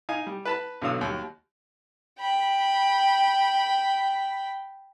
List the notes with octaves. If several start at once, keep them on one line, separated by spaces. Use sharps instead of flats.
D#4 F5 G#5
G3
B4 A5 B5
B1 D3 F#3 F5 D#6 E6
D#2 F#3 G3
G5 B5